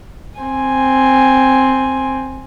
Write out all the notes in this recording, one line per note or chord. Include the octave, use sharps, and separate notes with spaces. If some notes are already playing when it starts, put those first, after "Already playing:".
C4 G#5